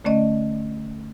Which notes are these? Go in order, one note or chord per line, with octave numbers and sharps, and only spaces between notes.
D3 A3 C#4 D5 D#5